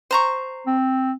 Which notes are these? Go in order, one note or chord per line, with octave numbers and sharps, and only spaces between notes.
C5 A#5 C#6
C4